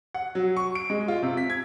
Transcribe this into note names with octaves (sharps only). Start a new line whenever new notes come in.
F#5
F#3
C#6
D7
G#3
F4
C3
B6
G#6